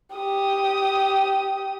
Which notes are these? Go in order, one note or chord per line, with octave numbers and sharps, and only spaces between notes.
G4 D#6